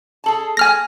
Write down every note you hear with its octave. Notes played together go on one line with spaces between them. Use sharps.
G#4 A4 A5
G#5 F6 A#6